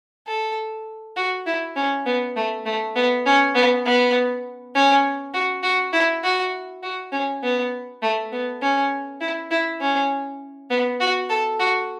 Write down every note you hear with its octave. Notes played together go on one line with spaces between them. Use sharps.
A4
F#4
E4
C#4
B3
A3
A3
B3
C#4
B3
B3
C#4
F#4
F#4
E4
F#4
F#4
C#4
B3
A3
B3
C#4
E4
E4
C#4
B3
F#4
A4
F#4